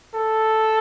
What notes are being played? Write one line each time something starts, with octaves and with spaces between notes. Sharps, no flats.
A4